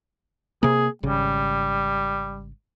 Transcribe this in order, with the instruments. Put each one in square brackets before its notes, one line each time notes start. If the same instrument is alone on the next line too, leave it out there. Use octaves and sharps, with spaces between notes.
[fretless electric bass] C3 A#3 [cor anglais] G#4
[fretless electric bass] G#1 C#3 [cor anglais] G3